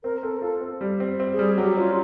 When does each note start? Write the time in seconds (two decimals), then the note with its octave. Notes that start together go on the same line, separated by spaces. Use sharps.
0.03 C4 A#4
0.23 C4 A4
0.38 A#4
0.42 F4 A4
0.61 C4
0.81 G3
1.00 C4
1.20 C4
1.33 G#4
1.39 G3
1.58 F#3 G4
1.77 C#4 F4